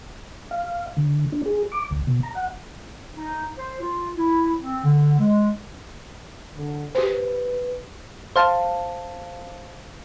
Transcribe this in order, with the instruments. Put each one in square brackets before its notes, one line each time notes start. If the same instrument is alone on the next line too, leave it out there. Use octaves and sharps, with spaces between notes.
[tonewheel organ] F5
D3
D4
G#4
D6
D2
B2
A#5
F#5
[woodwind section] D#4
C5
F4
E4
C4
D3
G#3
[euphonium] D3
[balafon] G4 C5 [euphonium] B4
[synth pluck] C5 F5 A5